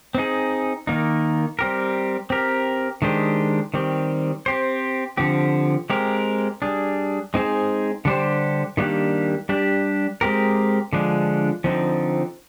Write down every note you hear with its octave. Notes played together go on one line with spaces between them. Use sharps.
C4 D#4 G#4
D#3 A#3 D#4
G3 C4 G4 A#4
C4 G4 A#4
D#3 G#3 D4 G4 C5
D#3 G3 C4 G4
C4 G4 C5
D3 F3 C4 G4
G#3 C4 G4 A#4
G3 D4 G#4
G#3 C4 D#4 G#4 C5
D3 G3 D4 G4 C5
D#3 G3 A#3 D4 G4
G3 D4 G4
G#3 C4 G4 A#4
D3 F3 G#3 D4
D3 F3 C4 D#4